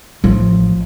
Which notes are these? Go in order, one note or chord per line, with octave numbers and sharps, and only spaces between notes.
A1 F3